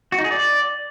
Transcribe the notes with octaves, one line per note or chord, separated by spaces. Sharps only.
F#4
D#4
G#4
D5